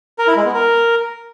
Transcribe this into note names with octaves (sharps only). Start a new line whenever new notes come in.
A#4
E4
G#3
B3
A#4